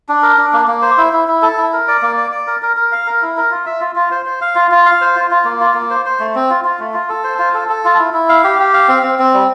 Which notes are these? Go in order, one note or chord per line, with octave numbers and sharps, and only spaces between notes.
D4
A#4
D4
A#3
A#3
C5
E4
E4
E4
A4
E4
A#4
D5
A#3
D5
D5
A#4
A#4
A#4
F5
A#4
E4
A#4
F4
E5
F4
F4
C5
C5
F5
F4
F4
F5
C5
F4
F4
A#3
F4
A#3
C5
C5
A3
C4
F4
F4
A3
F4
A4
C5
F4
A4
A4
F4
E4
E4
F5
G4
G4
F5
C4
C4
C4
G3